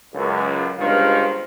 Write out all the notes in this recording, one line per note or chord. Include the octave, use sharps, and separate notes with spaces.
C#2 F#2
G1 C#2 G2 D#3 C5 F5